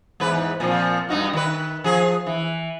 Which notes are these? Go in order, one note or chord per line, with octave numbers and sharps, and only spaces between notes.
E2 G#2 B4
A#2 F3 C4
G2 D#4 F#4
D#3 B4
F3 G#4
E3